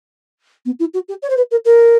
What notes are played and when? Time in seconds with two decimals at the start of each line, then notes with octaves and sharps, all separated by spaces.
0.65 B3
0.79 E4
0.93 F#4
1.08 G4
1.22 C#5
1.29 C5
1.36 B4
1.51 A#4
1.65 A#4